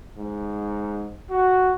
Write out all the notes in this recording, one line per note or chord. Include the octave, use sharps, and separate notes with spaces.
G#2
F#4